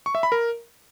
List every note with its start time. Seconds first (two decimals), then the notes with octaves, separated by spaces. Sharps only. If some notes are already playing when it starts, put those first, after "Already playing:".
0.06 C#6
0.15 E5
0.23 B5
0.32 A#4